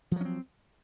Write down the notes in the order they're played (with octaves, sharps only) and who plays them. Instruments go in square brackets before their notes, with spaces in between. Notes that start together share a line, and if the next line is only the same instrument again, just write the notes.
[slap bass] F3
F#3
C#4
C4